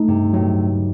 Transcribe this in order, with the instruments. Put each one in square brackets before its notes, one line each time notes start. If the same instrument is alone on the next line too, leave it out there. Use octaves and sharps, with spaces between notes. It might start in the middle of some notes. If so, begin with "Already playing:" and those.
Already playing: [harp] A3 [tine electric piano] D#4
[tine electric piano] G2 [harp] C3
[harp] A2 [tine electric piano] F#3